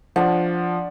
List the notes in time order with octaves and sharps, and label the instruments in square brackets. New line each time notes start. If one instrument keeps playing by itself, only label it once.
[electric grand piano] F3 [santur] D4 F#5